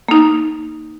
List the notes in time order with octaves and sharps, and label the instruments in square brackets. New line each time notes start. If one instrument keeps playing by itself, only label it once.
[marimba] A#3 D#4